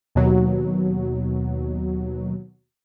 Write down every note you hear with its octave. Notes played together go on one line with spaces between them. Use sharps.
D#2 B2 F#3